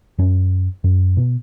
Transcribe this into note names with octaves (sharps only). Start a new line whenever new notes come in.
F#2 C#4
F#2
B2